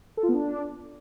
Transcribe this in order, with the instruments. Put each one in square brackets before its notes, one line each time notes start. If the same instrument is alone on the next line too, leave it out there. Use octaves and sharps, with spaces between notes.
[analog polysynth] A4
F4
B3
D4